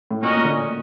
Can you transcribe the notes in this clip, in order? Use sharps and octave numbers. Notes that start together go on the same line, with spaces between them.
A2
A#2 C#4 F#4 A#4 D#5
A#2
D3